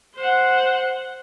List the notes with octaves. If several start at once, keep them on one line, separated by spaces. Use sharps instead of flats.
C5 F#5